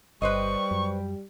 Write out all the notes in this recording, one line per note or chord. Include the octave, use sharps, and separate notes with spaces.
G1 G3 B4 C5 D#5 C#6
F#2